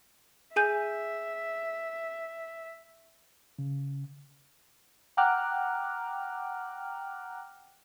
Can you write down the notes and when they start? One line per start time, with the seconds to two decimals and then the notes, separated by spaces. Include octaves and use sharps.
0.56 G#4 E5 G#5 G6
3.59 C#3
5.17 F#5 G5 A#5 D6 F6 F#6